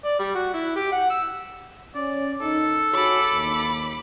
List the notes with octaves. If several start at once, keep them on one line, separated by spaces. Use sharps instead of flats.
D5
G3
F#4
E4
G4
F#5
E6
C#4 D5
D#2 D#4 A4
F#4 G#4 C#5 B5 D6
D#2